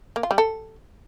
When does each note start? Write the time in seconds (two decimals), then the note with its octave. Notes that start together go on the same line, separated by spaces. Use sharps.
0.16 A#3
0.23 F4
0.31 G3
0.38 A4